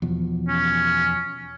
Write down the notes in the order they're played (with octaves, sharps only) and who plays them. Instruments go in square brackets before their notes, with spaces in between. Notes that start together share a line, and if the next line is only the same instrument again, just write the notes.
[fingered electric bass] E2 B2 F3
[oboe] C#4